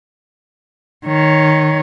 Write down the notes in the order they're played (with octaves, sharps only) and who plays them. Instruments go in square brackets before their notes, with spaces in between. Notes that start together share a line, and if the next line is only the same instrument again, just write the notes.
[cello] D#3 C#5